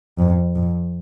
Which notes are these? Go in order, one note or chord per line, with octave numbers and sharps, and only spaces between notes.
F2
F2